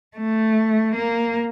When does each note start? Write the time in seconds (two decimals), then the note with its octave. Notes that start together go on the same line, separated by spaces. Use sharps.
0.17 A3
0.95 A#3